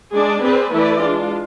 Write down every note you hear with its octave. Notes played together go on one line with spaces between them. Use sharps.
G#3 D4 G#4 D5
C4 G#4 B4 D5
E3 A3 E4 B4 D5
G#3 D4 F4